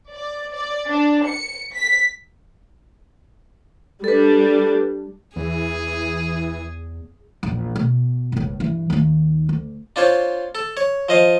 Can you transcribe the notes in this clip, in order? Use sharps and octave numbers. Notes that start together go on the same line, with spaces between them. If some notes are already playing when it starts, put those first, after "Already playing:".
D5
D5
D4
C#7
B6
G3 D4 A4 B4
E2 E3 G#4
A#1 E2
B2
F#1 C#2
G2 E3
D#2 D#3
D2
D4 F4 C5 C#5
A4
C#5
F3 D#5 F5